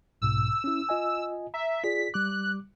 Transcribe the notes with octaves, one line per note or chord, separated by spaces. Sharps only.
B1 G#2 B2 E6
C#4 E4
F4 D#5 G#5
E5 A#5
F4 G#4 D5 B6
G3 D6 F#6